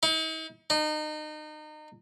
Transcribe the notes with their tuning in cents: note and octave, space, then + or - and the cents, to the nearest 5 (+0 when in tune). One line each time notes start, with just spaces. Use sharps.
D#4 +45
D#4 -30